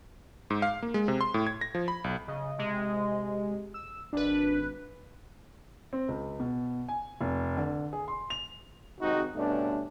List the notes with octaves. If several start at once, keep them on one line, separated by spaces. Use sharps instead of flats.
G#2
F5
A#3
G#3
C3
C6
A2
G#6
A#6
F3
B5
B1
C#3 D#5
C3 G#3
E6
G#1 D4 B4
C4
C#2
B2
G#5
F1
D3
G#4
C6
F7
G#1 C3 G#3 C4 D#4 F#4
G2 B2 A3 C#4 D4